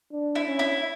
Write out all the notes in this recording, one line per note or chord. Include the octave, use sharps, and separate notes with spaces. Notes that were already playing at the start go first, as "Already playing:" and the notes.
D4
E4
C#4
E4